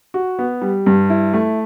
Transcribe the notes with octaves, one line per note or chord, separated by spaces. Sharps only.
F#4
B3
G3
G2
E4
A3